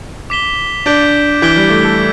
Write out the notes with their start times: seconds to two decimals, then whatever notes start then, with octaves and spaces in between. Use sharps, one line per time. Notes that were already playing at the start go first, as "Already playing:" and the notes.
0.30 D6 B6 E7 G7
0.86 D4 G6 B6 D7 G7
1.42 E3 G6 B6 D7 G7
1.56 G3
1.70 A3
1.84 A4